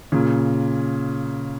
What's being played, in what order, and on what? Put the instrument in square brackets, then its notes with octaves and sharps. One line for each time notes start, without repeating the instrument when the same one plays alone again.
[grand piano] A#2 C#3